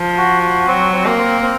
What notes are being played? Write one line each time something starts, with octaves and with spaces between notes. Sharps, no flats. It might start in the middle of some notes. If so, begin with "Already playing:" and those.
Already playing: F3
F#4
F#4
F#3 C4
C4
A#3
C4
C4